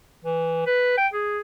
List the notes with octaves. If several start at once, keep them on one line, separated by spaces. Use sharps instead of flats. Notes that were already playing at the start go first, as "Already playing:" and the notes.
E3
B4
G5
G#4